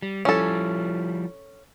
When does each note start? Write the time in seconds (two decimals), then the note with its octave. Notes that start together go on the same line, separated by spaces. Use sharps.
0.02 G3
0.25 F3 G3 C#4 E4 A4